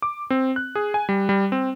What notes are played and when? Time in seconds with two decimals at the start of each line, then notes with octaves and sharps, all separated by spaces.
0.02 D6
0.30 C4
0.56 F#6
0.75 G#4
0.94 G#5
1.09 G3
1.29 G3
1.52 C4